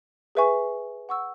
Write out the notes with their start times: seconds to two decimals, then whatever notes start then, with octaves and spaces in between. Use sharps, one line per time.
0.35 G#4 B4 E5 G#5 C#6
1.09 F#5 C#6 E6